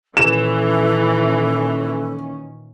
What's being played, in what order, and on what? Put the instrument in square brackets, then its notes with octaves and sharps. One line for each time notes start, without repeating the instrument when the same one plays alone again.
[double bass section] A#2 D#3 C#4 [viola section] E3 [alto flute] A4 [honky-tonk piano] E7